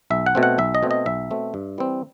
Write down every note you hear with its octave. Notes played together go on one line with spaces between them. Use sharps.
B1 E5
F#5
B2 A3 C4
F#5
B1 E5
D#5
B2 A3 C4
D#5
B1 E5
B2 A3 C4
G2
E3 G3 C4